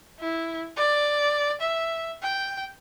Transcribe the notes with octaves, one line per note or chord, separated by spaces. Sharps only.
E4
D5
E5
G5